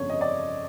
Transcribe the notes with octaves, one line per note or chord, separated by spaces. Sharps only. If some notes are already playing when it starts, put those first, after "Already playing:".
Already playing: G1 F2 C#3 C#5
D#5
D5